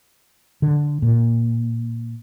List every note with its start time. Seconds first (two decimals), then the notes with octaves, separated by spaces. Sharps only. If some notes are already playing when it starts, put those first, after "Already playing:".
0.62 D3
1.02 A#2